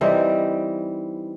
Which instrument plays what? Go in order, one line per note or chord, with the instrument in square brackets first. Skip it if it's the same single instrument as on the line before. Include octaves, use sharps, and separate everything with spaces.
[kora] E3 G3 C4 D#4